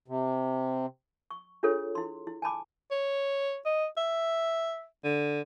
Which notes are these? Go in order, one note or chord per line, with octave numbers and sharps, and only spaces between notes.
C3
C#6
D4 F4 G#4 A4 C#5
E4 C6
E4
G#5 A5 B5 D6
C#5
D#5
E5
D3